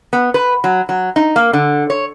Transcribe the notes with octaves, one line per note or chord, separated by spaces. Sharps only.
B3
B4
F#3
F#3
D#4
A#3
D3
C#5